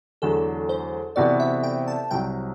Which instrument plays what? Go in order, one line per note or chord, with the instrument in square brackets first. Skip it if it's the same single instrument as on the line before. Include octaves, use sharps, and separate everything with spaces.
[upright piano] E2 D3 F#3 A3 D4 [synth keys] A4
[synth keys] C5
[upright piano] C3 E3 B3 F#4 [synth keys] D5
[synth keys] E5
G5
A5
[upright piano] C2 C3 F#3 [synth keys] G5